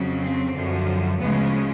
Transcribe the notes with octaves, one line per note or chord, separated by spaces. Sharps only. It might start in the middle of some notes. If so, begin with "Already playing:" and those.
Already playing: F2 C#3 F#3
C4
F#2 D3 F3
D2 C#3 F3 G#3 B3